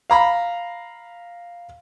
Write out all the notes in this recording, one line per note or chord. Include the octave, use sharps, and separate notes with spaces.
F5 A#5 B5